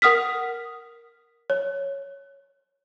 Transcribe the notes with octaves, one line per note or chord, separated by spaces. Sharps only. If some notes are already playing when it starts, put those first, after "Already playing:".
A#4 F#5 D#6 F6 B6
C#5